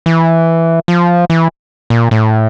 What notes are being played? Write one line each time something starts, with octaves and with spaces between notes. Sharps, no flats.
E3
F3
E3
A#2
A2